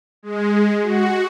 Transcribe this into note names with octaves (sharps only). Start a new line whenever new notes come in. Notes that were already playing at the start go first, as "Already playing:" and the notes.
G#3
F#4